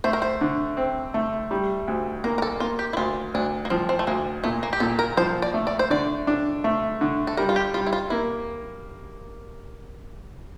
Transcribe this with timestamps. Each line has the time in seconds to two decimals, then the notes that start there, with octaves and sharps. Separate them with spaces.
0.04 A3 C5
0.13 A#4
0.22 C5
0.41 D3
0.77 C4
1.14 A3
1.51 G3
1.88 D2
2.24 A#3 A#4
2.38 A#4
2.42 A4
2.60 A#3 F4
2.79 G4
2.93 E4
2.97 D2 F4
3.34 D2 D4
3.65 A#3
3.70 F3 C4
3.89 C4
3.99 A3
4.07 D2 A#3
4.44 A#2 A3
4.63 A#3
4.73 G4
4.80 A#2 A4
4.99 A#4
5.17 F3 C5
5.42 D5
5.54 A3
5.67 D5
5.79 C5
5.90 D3 D5
6.27 D4
6.64 A3
7.01 D3
7.27 A4
7.37 G3 A#4
7.49 F4
7.56 G4
7.74 G3 F4
7.87 E4
7.93 F4
8.10 A#3 E4